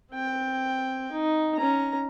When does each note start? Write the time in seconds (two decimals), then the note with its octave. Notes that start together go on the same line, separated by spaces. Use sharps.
0.12 C4 G5
1.12 D#4
1.56 C#4 A#5